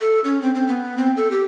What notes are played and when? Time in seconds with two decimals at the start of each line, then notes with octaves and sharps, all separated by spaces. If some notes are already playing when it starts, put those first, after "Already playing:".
0.01 A4
0.24 C#4
0.42 C4
0.55 C4
0.68 B3
0.98 C4
1.17 A4
1.31 G4